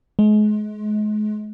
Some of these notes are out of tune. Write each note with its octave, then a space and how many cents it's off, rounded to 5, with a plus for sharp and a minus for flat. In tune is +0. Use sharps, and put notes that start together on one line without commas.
G#3 +35